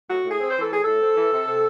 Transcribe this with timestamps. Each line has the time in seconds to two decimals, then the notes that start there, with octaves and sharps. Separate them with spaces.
0.09 A2 F#4
0.25 A2
0.31 G#4
0.40 C4
0.51 C5
0.56 E3
0.62 A4
0.71 A2 G#4
0.84 A2 A4
1.02 C4
1.17 E3
1.33 C3
1.48 C3